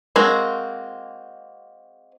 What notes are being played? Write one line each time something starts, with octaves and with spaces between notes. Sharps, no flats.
G#3 A#3 C4 F#4